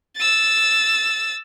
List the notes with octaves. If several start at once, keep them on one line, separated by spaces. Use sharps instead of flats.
E6 A6